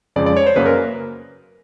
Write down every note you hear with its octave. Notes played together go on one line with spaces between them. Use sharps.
F2 C#3 F3 G#3 D5
D5
C#5
C5
F#2 C#3 F#3 A#3 B4
A#4